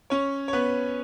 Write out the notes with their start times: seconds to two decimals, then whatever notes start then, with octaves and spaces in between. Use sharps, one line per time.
0.10 C#4 C#5
0.48 C#5
0.53 B3 B4